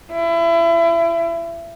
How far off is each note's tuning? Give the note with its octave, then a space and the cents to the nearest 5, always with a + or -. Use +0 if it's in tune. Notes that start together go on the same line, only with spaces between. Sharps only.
E4 +30